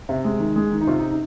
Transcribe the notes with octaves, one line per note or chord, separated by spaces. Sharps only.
C3
G#3
D#3
G#3
D#3
D#4
C3 F4
D#4
D#4